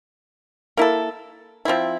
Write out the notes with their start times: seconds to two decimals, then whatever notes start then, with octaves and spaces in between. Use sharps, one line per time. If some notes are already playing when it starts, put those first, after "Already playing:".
0.77 A#3 E4 A4
1.65 F3 C4 E4